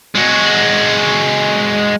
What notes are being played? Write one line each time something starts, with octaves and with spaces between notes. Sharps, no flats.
G#3 F#4